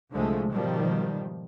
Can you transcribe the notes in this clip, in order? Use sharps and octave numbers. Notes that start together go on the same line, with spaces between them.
C2 D3 F3 G#3 A3
G#2 B2 D#3 F3 G3